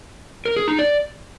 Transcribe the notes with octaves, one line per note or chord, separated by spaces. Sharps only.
A#4
G#4
D#4
D5